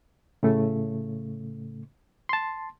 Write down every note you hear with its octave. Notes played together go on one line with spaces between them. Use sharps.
A2 C#3 A3
A5 C6